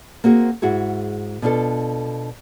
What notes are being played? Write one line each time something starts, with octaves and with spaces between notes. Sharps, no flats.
A#3 C4 F#4 G#4
G#2 E4 F#4 G#4
B2 D4 F4 A4